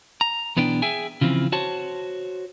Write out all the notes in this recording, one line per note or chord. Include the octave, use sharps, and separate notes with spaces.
A#5
B1 E3 B3 D4 G5
G#4 E5 G5 G#5
C#3 E3 F3 C4
F#4 C5 C#5 A5